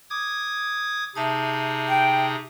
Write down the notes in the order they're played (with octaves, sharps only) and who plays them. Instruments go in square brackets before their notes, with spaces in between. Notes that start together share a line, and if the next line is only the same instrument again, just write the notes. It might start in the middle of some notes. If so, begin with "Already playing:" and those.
[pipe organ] D6 D#6 G#6
[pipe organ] C3 D#4 G#4 [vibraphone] E5 A5 D#6
[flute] G5